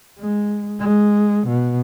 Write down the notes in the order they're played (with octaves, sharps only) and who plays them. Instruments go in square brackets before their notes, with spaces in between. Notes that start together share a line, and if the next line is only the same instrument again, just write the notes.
[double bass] G#3
G#3
B2